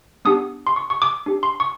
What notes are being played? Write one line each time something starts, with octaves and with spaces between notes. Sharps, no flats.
B3 D4 G4 D#6
C6
C#6
C#6
D6
D4 G4
C6
C#6